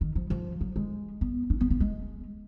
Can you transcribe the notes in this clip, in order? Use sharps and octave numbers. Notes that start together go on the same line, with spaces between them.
D#3
F3
F3
F#3
G#3
B3
D4
B3
A#3
G#3